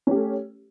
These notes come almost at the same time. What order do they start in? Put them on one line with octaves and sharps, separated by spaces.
C#4 G4 A3